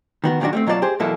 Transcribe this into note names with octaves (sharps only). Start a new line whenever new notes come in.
D#3 B3 F#4
A#2 D#3 F#3 C4 D4 F#4
G3 A3 C4
B2 F#3 F4 G4 D5 A5
G4 G#4 C5
E2 B2 F#3 A#3 E4 A4